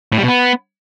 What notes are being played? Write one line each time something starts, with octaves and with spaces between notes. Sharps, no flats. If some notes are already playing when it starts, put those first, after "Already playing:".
A2
G3
B2
B3